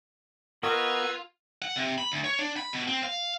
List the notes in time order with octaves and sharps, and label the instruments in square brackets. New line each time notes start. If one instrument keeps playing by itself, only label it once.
[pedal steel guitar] B3 F#4 D#5 [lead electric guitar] F4 [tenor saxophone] A#4 [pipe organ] B4 E6 G#6
[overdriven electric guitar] F#5
C3
B5
D2
C#5
D4
B5
B2
C4
F5